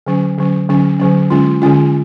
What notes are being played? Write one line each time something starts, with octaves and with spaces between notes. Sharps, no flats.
D3 F#3 C#4
D3 F#3 C#4
D3 F#3 C#4
D3 F#3 C#4
D3 G#3 C#4 F4
D3 G#3 C#4 F4